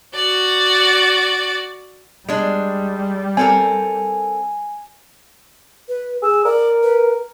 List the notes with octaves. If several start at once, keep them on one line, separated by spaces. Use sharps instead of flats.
F#4 D5
G3 G#3 D4
C4 A4 A#4 G#5
B4
G#4 E6
A#4 D5
B4